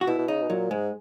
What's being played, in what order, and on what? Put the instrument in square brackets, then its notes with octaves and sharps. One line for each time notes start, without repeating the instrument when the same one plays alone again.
[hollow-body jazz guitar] F#4
[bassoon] B2 [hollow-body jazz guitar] E4
[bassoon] B2
[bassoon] C#3 [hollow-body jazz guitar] D#4
[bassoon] B2
[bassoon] A#2 [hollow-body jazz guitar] F#3
[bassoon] G#2 [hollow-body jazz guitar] G#3